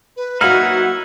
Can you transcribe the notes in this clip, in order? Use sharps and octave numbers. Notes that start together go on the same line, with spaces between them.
B4
F#3 A#3 D#4 E4 F#5 F6